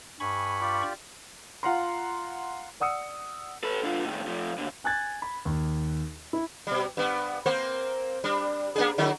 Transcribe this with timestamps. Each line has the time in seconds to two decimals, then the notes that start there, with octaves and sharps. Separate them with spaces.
0.20 G2 G#5 B5 C#6
0.61 F4 G4 D5
1.63 F4 F5 F#5 A#5 C6
2.80 D5 F#5 D#6 E6 C#7
3.63 A4 B4
3.83 D3 F4
4.05 A2 D#3
4.27 F3 A3
4.58 D#2 D3
4.84 G#5 F#6 G#6 A6
5.22 B5
5.45 D#2
6.33 E4
6.67 B2 G3
6.97 G2 B3
7.46 A#3 C4 C5
8.24 G3 D4
8.76 A#3 D4 G#4
8.98 D3 F#3 E4